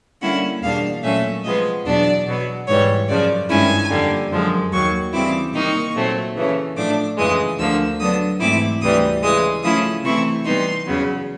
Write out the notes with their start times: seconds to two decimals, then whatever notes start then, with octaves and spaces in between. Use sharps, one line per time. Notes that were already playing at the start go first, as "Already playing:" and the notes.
0.21 D3 G3 A#3 C#4 E4 F#5
0.63 E2 B2 G3 A#3 D4 F5
1.03 A#2 F#3 A3 C#4 E5
1.44 C3 F3 G#3 B3 D#5
1.85 E2 B2 F#3 B3 D4 D5
2.26 B2 F#3 B3
2.67 G#2 E3 G3 C#5
3.08 F#2 C#3 F3 D5
3.49 G2 D#3 G#3 C#4 E4 G#5
3.90 F2 D3 G3 A#3
4.31 F#2 D3 F3 G#3
4.72 D#2 D#3 F#3 C#6
5.13 C#3 E3 G3 C4 E4 D6
5.53 C3 D#3 G3 A#3 D#4 C#6
5.95 A#2 F#3 A3 C4
6.36 C#3 E3 A3 C#4
6.77 A2 F3 A3 D4 D6
7.18 F2 C#3 E3 G#3 D#6
7.59 D2 D3 F3 A#3 E6
7.99 D3 F#3 B3 D4 D#6
8.40 G#2 E3 A3 C4 E4 D6
8.81 D2 C3 E3 G3 D#6
9.22 C#3 E3 G#3 D#6
9.63 C#3 F3 A3 C#4 E4 D#6
10.04 C3 E3 A3 C4 E4 C#6
10.45 C3 E3 G3 B3 D#4 C6
10.86 E2 C#3 F#3 B3